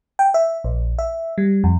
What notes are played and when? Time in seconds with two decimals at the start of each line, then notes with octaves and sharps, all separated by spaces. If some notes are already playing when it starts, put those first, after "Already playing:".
0.19 G5
0.34 E5
0.64 A#1
0.99 E5
1.38 G3
1.64 F2